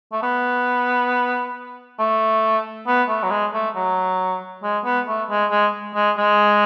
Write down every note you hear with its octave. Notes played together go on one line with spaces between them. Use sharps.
A3
B3
A3
B3
A3
F#3
G#3
A3
F#3
G#3
B3
A3
G#3
G#3
G#3
G#3